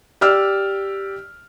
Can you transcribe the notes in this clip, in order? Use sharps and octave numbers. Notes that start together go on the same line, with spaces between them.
G4 D5 E6 F6